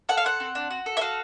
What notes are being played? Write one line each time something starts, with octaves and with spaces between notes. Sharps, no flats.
A4 F#5
F5
C4 F#5
C4
D4
F#4
A4
E5
F#4 F5